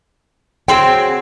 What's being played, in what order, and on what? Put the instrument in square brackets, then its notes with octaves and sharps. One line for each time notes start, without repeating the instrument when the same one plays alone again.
[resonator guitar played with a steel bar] F#3 C4 G#4 [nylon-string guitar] G5